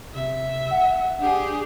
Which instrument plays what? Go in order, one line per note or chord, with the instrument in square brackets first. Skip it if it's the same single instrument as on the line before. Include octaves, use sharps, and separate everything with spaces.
[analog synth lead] C3 [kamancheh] E5
[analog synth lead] F#5
[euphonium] D4 [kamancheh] G4 G#4